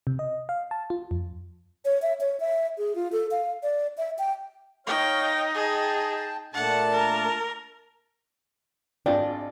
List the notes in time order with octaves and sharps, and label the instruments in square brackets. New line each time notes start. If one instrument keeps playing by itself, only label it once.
[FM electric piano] C3
D#5
F5
A5
F4
F2
[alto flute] C#5
E5
C#5
E5
G#4
F4
A4
F5
D5
E5
G5
[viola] D#4 [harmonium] C#5 F5 [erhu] G5
[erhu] G#4 [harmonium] G5 A5
[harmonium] A#2 A3 D4 [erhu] F#5 [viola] A5
[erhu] A#4
[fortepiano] G#1 F4 G5 [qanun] D4 D#5 [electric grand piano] D5